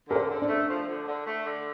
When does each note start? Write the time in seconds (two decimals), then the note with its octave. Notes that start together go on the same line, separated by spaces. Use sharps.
0.09 D3 A#4
0.16 C5
0.29 D3
0.42 D4
0.48 A3
0.68 F3
0.87 D3
1.06 D3
1.26 A3
1.45 D3